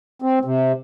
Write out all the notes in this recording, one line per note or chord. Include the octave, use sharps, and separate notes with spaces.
C4
C3